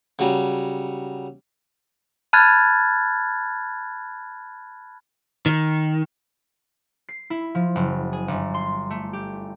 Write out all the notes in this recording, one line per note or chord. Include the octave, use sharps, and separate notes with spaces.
C#3 F#3 G3
A5 B5 F6 F#6 G#6 A6
D#3
C7
E4
F3
F#1
G#4
G1
C6
A3
G4